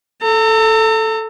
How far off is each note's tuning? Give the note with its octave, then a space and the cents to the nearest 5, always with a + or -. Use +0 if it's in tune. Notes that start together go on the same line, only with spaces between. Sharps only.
A4 +0 A#5 -45